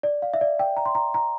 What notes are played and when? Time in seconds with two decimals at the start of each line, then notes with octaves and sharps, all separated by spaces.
0.03 D5
0.22 F5
0.34 E5
0.41 D5
0.59 G5
0.77 A#5
0.86 C6
0.95 A#5
1.14 A#5